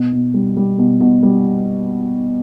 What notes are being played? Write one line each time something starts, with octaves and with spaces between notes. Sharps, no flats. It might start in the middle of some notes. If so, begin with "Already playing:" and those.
Already playing: B2
B2
G3
G3
B2
B2
G3